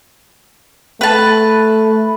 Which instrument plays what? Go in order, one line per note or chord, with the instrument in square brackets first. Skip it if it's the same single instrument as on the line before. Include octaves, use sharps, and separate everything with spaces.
[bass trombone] A3 [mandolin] B4 A5